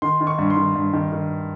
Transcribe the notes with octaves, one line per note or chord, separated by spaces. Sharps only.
D#3 C6
D#3
C#6
G2
C6
D#3
G2
D#3
D#3